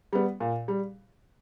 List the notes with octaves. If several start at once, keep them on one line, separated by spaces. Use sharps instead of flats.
G3 B3
A#2
G3